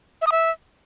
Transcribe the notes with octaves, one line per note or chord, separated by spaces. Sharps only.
E5
D#6
E5